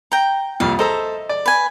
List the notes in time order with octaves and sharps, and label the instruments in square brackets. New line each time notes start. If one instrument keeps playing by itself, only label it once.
[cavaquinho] G5 A#5
[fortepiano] C2 F2 A#2 [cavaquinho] F5
[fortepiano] A4 C5 A#5 [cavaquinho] D#5 E5
[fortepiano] D5
[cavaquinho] B4 G#5